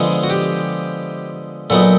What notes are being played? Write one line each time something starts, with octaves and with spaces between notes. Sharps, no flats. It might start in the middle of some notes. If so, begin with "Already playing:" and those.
Already playing: D3 F3 G#3 B3 D4
F#4
G4
A#2 F#3 B3 D#4 A4